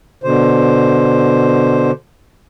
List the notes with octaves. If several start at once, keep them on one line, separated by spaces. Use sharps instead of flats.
B2 D3 C5